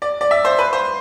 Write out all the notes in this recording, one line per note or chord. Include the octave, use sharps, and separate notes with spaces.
D5
D5
E5
C5
B4
C5